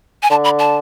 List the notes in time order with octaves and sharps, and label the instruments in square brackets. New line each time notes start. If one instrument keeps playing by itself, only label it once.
[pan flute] G#5
[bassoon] D3 [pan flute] A5
[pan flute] B5
A5